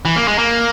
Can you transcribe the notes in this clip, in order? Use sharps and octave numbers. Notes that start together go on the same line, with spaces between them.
E3
A#3
G#3
A#3